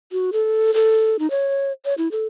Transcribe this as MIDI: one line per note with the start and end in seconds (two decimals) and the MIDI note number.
0.12 0.30 66
0.33 0.74 69
0.74 1.16 69
1.19 1.30 63
1.31 1.72 73
1.85 1.94 73
1.98 2.08 64
2.12 2.27 69